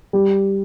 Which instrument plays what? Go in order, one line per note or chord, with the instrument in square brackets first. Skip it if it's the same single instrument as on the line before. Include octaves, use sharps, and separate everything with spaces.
[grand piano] G3